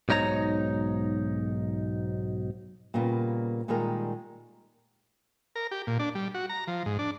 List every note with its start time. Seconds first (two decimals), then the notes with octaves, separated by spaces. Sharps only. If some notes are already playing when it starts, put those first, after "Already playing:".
0.09 B1 G#2 D#4 C#5 A#5
2.94 A#2 C#3 G3 A#3 B3
3.68 A#2 D#3 G3 G#3 G#4 A#4
5.55 A#4
5.71 G4
5.87 A#2
5.99 D4
6.15 G3
6.34 F#4
6.49 A#5
6.67 F3
6.86 G#2
6.99 D4